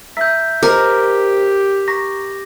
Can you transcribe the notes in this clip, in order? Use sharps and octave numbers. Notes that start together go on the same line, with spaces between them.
E5 A#5 E6 G6 B6
G4 A#4 C5 D#5 D6
A#5 C#6 A#6 B6